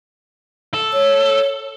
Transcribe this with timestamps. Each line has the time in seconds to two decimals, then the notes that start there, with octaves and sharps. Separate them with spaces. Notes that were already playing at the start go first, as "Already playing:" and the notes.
0.74 A4
0.93 C#5